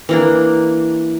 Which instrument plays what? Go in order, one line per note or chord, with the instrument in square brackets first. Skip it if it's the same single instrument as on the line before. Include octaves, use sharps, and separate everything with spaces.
[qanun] E3 A#3 D4